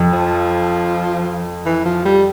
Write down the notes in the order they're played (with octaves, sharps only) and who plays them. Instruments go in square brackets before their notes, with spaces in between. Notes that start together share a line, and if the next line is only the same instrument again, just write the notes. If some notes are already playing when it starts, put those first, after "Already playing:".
Already playing: [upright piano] F2
[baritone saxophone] F3
E3
F3
G3